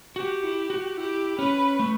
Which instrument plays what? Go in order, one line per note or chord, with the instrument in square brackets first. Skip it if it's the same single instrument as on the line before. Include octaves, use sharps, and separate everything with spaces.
[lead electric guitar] F#4 [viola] G4
[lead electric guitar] E4
F#4
[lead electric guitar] E4 [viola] G4
[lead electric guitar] C#4 [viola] B4
[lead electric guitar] A3